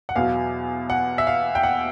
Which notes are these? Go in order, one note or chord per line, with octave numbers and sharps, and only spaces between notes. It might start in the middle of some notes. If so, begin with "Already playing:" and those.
F#5
E2 B2 F#3 F5
F#5
E5
F5
G5
F#5